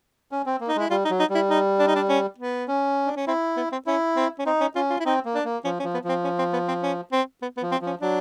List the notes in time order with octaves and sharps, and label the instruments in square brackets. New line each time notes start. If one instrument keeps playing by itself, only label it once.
[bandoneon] C#4
C4
A#3
[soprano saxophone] D#4
[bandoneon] G#3 [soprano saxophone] E4
[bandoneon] G3 [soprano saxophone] F4
[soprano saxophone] D#4
[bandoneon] F#3
[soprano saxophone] D#4
[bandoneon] G3
[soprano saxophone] E4
D#4
D4
D#4
D4
C#4
B3
[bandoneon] C#4
[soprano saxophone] D4
C#4
[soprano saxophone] C4 [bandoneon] E4
[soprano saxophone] B3
C4
[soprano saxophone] C#4 [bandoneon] E4
[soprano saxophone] C4
C#4
[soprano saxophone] C4 [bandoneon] D#4
[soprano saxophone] C#4
[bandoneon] C#4 [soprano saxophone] F4
[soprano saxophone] F4
E4
[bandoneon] C4 [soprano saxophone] D#4
[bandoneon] A#3
[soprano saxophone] D4
[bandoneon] A#3
[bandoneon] F3 [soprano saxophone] C#4
[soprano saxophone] C#4
[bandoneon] F3
[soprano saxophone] B3
[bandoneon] F3 [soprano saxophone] C4
[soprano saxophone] C#4
C4
B3
C4
C#4
C4
B3
B3
[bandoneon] F3
[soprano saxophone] C4
[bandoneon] F3
[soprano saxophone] C#4
[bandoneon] F#3 [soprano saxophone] D4